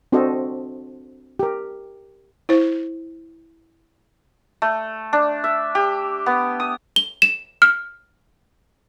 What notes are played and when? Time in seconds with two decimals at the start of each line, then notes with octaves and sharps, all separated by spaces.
0.12 C4 D4 F#4 A4 C5 D#5
1.39 G4 A#4
2.49 E4 C5
4.62 A3
5.13 D4
5.44 E5
5.75 G4
6.26 B3
6.60 D#6
6.96 G7
7.22 E7
7.62 F6